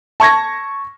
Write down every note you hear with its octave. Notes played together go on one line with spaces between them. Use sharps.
A5 C#6 G#6 A#6